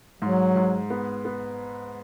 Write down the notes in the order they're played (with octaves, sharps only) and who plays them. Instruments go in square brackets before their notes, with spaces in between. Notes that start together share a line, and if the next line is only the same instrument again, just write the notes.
[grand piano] G#2 [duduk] F#3
[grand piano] G#2
B3
B3